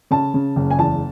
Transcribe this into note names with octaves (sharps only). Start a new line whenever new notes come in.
C#3 A5
C#3
F#1
G#5
E2 A5